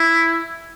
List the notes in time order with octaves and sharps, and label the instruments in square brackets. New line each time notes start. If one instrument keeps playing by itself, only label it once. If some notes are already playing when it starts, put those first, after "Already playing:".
Already playing: [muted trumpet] E4